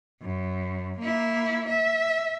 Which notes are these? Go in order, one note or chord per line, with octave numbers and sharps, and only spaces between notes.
F#2
A#3 E4
E5